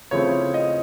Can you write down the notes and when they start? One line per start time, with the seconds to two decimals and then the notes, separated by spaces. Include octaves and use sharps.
0.11 C#3 F3 A3 C4 E4 C#5
0.54 D#5